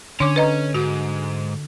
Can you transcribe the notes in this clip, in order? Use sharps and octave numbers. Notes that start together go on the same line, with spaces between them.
D3 C#4 D4 C#5 D6
B4 D#5 A#5
G#2 F#4